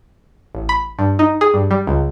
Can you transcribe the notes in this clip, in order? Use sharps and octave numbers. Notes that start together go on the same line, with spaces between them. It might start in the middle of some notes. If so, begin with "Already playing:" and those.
A1
B5
G2
D#4
G#4
G2
G3
C#2